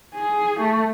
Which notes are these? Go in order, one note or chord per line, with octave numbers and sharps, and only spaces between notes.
G#4
A3